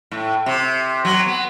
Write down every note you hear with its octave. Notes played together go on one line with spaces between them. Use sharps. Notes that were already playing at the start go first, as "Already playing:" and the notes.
A2
C3
F#3
B3